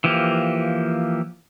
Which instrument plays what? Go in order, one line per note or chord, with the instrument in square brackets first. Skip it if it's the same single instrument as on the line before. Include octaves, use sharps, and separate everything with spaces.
[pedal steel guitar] E3 F3 A#3 G4